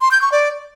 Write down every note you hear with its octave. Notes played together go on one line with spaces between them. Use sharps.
C6
G6
C#6
D5